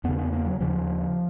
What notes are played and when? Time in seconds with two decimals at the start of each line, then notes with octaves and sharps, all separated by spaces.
0.04 E2 C#3 B3
0.18 B3
0.33 A#3
0.46 F#3
0.60 D#2 C#3 F3